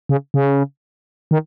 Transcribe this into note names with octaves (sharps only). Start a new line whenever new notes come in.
C#3
C#3
D#3